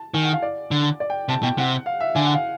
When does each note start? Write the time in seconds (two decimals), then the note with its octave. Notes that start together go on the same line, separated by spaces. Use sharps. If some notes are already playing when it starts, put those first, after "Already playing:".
Already playing: A5
0.14 D#3 G#5
0.23 F#5
0.33 F5
0.43 D5
0.71 D3
1.00 D5
1.10 G5
1.29 C3 A5
1.43 B2 G5
1.58 C3 F#5
1.86 F5
2.00 E5
2.15 D3 G#5
2.25 F#5
2.34 F5